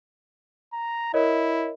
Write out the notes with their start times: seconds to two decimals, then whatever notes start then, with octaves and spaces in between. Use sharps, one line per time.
0.73 A#5
1.14 E4 A#4 C#5 D#5